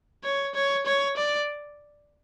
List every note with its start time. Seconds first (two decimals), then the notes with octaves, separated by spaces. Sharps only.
0.24 C#5
0.55 C#5
0.86 C#5
1.17 D5